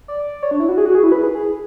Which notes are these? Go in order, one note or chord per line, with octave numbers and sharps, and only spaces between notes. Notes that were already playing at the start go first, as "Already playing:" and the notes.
D5
C#5
D4
E4
F#4
G#4
F#4
G#4
E4
B4
G#4
G#4